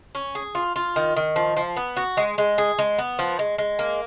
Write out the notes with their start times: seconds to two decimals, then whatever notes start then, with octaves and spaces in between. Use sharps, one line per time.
0.15 C#4
0.35 G#4
0.55 F4
0.76 F4
0.96 D#3
1.16 D#3
1.36 F3
1.57 F3
1.77 B3
1.97 F#4
2.17 G#3
2.38 G#3
2.58 G#4
2.79 G#3
2.98 B3
3.19 F3
3.39 G#3
3.58 G#3
3.79 A#3